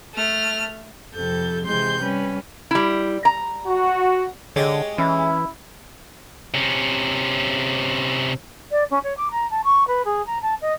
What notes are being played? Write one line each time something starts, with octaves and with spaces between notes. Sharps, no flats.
A3 F6
F2 C3 A4 G6
C3 E3 G#3 C6 G6
G3 C#4 B4
G3 E4
A#5
F#4
D3 G#3 G4 C#5 D#5
E3 C#4 E4
C3 C#4
D5
C#4
C#5
D6
A#5
A5
C#6
B4
G#4
A#5
A5
D#5